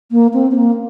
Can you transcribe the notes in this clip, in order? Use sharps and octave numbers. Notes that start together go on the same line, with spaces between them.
A#3
C4
C4
A#3